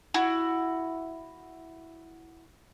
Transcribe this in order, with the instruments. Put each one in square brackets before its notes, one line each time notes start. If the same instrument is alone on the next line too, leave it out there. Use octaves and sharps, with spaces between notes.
[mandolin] E4 F#4